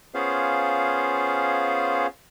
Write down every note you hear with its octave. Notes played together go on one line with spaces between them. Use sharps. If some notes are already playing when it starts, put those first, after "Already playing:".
B3 C#4 F4 G#4 C5 F5